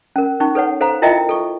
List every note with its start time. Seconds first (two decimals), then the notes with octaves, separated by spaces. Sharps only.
0.16 C#4 A#4
0.40 C#4 D#4 C#6
0.55 A4 B4 C#5 F#5
0.81 A4 C5 F5 A#5
1.02 E4 F4 A#4 D#5 E5 G5
1.29 A4 C#6